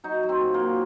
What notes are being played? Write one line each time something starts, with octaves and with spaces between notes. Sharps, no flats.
F#3 D#4
F#3
C4
A#2
A#3
F#3